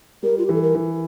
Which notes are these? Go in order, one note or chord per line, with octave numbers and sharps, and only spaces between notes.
G3 A#4
F4
G4
E3 A4
A#4
E3